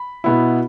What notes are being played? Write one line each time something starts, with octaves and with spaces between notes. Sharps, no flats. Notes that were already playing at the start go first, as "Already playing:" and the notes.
Already playing: B5
B2 B3 E4